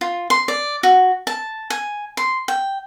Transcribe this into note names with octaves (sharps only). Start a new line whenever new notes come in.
F4
C6
D5
F#4
A5
G#5
C6
G5